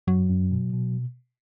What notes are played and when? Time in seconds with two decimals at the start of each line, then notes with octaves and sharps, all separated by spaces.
0.07 F#2 F#3
0.29 F#2
0.51 B2
0.73 B2